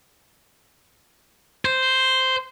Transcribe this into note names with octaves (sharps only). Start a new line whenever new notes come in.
C5